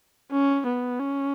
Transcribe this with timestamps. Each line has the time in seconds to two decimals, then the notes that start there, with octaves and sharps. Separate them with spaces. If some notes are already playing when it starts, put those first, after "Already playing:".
0.31 C#4
0.66 B3
1.00 C#4